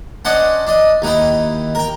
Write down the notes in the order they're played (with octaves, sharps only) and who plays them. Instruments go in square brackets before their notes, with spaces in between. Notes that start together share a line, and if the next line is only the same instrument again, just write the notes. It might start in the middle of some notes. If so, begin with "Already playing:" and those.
[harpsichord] C#4 D4 C5 D#5 F#5
D4 D#5
D#2 D#4 E4 G5
A#4 G5